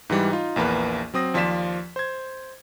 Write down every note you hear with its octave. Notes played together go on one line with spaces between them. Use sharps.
G#2 E3 G3
D#4 F4
A#1 E2 A#3 B4
F#3 C4 D#6 A#6
D#2 F3 F4 D5 B6 E7
C5 G#6